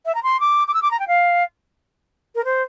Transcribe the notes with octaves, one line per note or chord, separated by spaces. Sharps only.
E5
A#5
C6
D6
D6
E6
D6
A#5
G5
F5
A#4
C5